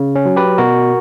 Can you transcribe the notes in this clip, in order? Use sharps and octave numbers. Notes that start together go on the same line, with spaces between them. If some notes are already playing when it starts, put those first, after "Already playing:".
Already playing: C#3
C#4
F#3
G4 B4
B2 F#4 A#4